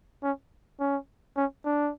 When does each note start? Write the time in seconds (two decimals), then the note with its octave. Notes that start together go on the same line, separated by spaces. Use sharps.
0.23 C#4
0.80 C#4
1.37 C#4
1.65 D4